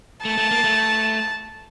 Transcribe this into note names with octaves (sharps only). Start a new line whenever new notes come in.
A3 A5
A3
A#3
A3